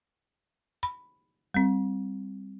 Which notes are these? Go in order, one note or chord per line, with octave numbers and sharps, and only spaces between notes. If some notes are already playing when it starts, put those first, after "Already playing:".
B5
G3 C4